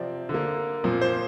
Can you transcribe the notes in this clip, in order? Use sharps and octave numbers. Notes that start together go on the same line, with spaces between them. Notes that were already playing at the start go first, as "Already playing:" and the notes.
Already playing: C3 F3 C4 D5
D3
A#3
A#2 F3 C4
C5